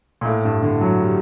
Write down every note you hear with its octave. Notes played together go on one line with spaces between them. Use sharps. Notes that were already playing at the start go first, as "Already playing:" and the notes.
A#2
A2
G2
D3
F#3
G3